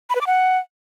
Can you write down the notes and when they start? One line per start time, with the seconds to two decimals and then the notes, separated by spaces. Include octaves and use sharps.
0.10 B5
0.15 B4
0.21 D6
0.27 F#5